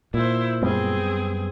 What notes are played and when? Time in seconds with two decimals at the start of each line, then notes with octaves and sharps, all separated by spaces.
0.14 A#2 E4 C5
0.62 F#2 G3 B3 C4 G#4